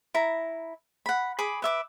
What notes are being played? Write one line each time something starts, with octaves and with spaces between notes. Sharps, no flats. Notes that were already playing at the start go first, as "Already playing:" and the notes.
E4 A#5
F#5 B5
G#4 B5 D6
B4 E5 D6